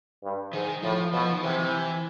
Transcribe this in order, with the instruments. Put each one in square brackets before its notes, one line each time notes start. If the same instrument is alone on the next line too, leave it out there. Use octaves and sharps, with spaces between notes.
[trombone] G2
[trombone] G#2 [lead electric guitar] D#3
[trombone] A2 [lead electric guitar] F3
[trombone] B2 [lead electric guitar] F3
[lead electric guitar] D#3
[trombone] C3 [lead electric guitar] E3
[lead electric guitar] E3